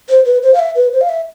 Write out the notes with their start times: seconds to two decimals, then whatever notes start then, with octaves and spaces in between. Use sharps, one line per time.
0.09 C5
0.25 B4
0.43 C5
0.54 F5
0.59 E5
0.75 B4
0.93 C5
1.01 F5
1.09 E5